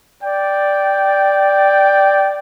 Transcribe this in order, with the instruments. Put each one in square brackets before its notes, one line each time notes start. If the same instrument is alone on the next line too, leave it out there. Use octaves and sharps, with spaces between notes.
[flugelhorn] D5 [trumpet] G5